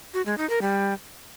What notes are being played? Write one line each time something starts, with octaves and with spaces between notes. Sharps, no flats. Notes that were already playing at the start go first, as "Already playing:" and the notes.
F#4
G#3
D#4
A#4
G3